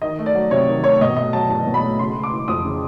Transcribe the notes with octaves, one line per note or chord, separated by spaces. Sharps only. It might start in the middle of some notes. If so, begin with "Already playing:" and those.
D#3 D#5
A3
D5
F#3
C3 C#5
D#3
A3 C#5
B2 D#5
A3 D#5
F#3 A5
E2 A5
B2
B5
A3
C#3 C6
G#3
D6
E3
F2 D#6
C#3